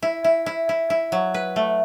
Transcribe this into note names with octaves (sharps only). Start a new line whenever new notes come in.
E4
E4
E4
E4
E4
F#3
B4
A3